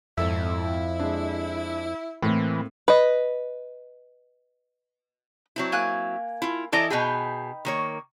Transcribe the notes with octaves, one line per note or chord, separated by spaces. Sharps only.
G#1 F2 E4 A4 E6
G#3 D4
A2 E3 A#3 C4 E4
B4 D#5
F#3 C4 E4
A#3 G#5 F#6
E4 F4
E3 E4 A4 D5 D#5 A#5
B2 D#4 G#4 B4 G5
D#3 A#3 C#5